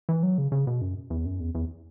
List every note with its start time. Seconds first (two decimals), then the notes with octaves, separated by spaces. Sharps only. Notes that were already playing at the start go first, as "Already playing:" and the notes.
0.09 E3
0.23 F#3
0.38 C#3
0.52 C#3
0.67 B2
0.81 F#2
1.10 E2
1.25 F#2
1.40 E2
1.55 E2